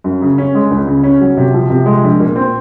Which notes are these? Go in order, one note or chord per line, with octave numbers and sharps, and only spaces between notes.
F#2
C#3
C#4
G#3
C#2
C#3
C#4
F#3
C3
F3
C3
G#3
A#1
A#2
C4